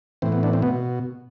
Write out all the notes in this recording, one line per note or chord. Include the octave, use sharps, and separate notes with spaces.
A2 E3 C4
B3
B3 D4
C4
B2 B3